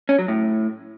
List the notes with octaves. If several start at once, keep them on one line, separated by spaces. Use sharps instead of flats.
C#4
F#3
A2